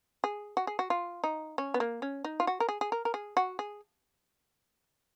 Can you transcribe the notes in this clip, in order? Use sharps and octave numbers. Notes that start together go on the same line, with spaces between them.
G#4
F#4
G#4
F#4
F4
D#4
C#4
B3
A#3
C#4
D#4
F4
F#4
A#4
G#4
G#4
A#4
A#4
G#4
F#4
G#4